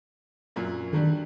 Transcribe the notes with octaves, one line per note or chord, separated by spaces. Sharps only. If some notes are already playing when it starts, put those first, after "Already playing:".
F#2 A#2 F#3
D3 D#3 F#3 G3